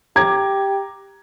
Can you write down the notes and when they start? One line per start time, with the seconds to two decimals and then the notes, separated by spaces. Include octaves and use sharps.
0.16 G4 A#5 D6 G#6